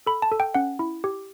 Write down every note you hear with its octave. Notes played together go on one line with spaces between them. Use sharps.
A4 B5
A5
A4
G5
C#4 F#5
E4
G4